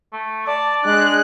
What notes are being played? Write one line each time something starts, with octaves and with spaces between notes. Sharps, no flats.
A3
D5 A5
G#3 D4 F#6